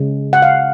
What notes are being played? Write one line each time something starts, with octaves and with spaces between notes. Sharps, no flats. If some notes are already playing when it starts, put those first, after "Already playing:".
Already playing: C#3 G#3
F#5
F5